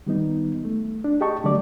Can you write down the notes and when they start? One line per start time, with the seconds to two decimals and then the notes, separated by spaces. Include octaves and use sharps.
0.07 D#3 G3 B3 D#4
0.65 A3
1.04 D4
1.21 G4 G#4 D#5 G5 A5 C#6
1.44 D3 F#3 A3 G4 D5 D6